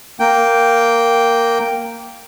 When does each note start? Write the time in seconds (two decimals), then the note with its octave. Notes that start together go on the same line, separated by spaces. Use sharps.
0.20 A#3 G5